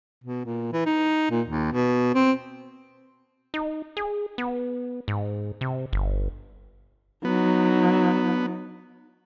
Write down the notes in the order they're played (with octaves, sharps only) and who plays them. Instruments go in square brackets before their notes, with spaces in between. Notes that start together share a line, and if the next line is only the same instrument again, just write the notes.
[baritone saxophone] B2
A#2
E3
D#4
A#2
D#2
B2
C4
[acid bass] D#4
G#4
B3
G#2
C3
G1
[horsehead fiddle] F#3 D#4 [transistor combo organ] B3